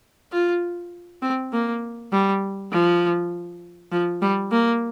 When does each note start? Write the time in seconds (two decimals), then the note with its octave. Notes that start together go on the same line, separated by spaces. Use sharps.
0.32 F4
1.22 C4
1.52 A#3
2.12 G3
2.72 F3
3.91 F3
4.22 G3
4.51 A#3